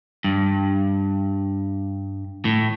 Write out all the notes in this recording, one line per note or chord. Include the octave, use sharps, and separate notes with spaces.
G2
A2